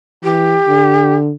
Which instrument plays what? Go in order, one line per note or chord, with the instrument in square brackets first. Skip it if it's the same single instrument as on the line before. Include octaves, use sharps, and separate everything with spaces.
[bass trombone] E3 [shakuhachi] G4
[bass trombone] D3